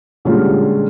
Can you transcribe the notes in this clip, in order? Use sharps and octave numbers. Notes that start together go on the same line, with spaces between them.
A#2 D3 G3 G#3 C#4 F4